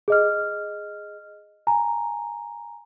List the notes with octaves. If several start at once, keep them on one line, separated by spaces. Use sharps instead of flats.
G#4 D#5 F6
G#5 A#5